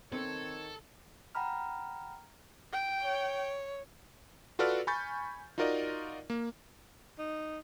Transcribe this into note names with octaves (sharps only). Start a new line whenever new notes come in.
D#3 C4 A4 C#5
F#5 G5 A#5 B5 F6
G5
C#5
F4 F#4 A4 B4 D5 F6
G#5 B5 C#6 G6 A6
D#4 F4 F#4 A#4 D5 D#5
A#3
D#4